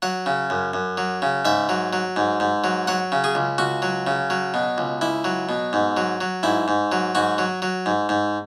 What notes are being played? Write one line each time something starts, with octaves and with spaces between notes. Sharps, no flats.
F#3 F#5
C#3
F#2
F#2
F#3
C#3
G#2 E5
F#3
F#3
G#2
G#2
F#3
F#3 F#5
C#3
G#4
C#2
C#2 F#4
F#3
C#3
F#3
B2
C#2
C#2 E4
F#3
B2
G#2
F#3
F#3
G#2 E4
G#2
F#3
G#2 F#4
F#3
F#3
G#2
G#2